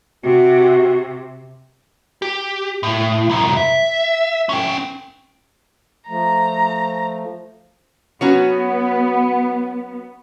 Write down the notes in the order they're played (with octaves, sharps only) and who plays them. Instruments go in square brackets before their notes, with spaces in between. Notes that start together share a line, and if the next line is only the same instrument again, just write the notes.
[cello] C3 [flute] F#4
[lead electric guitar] G4
A2
C2 F#2
E5
C#4 G5
[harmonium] F3 A3 [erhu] A#5
[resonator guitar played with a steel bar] F#3 C#4 F#4 [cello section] B3